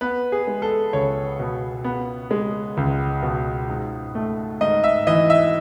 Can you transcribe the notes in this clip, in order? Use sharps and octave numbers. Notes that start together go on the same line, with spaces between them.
B3 B4
G#4
G#3
A4
C#2 C#5
B2
B3
G#3
C#2
B2
G#2
A3
G#2 D#5
E5
E3 D#5
E5